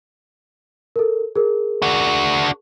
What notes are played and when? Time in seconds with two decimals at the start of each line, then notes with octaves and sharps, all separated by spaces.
0.96 A4 A#4
1.36 G#4 A#4
1.82 D4 F#4